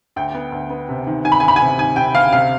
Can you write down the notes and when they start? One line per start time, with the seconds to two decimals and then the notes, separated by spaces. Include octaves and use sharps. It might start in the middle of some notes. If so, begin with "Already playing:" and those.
0.16 D2 G5
0.35 B3
0.52 D2
0.70 B3
0.89 C3
1.07 D#3
1.24 D#3 G#5
1.32 B5
1.40 D2 G#5
1.48 B5
1.56 C3 G#5
1.78 D#3 G#5
1.96 C3 G5
2.15 D2 F5
2.32 C3 F5